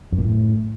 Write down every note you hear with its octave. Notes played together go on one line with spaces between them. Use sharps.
F#2
A#2
A2